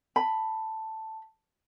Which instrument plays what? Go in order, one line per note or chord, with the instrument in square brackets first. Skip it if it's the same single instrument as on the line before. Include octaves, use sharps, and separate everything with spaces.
[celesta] A5 [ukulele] B5